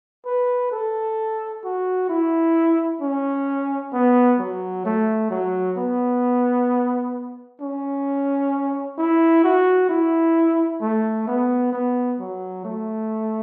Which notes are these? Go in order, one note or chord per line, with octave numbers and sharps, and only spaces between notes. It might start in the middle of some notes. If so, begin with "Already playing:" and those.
B4
A4
F#4
E4
C#4
B3
F#3
A3
F#3
B3
C#4
E4
F#4
E4
A3
B3
B3
F#3
A3